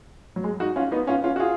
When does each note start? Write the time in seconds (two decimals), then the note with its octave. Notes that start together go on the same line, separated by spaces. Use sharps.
0.36 F#3
0.44 G#3
0.60 D#4 F#4
0.76 C#4 F4
0.92 B3 D#4
1.07 C#4 F4
1.24 C#4 F4
1.36 F#4
1.40 F4 G#4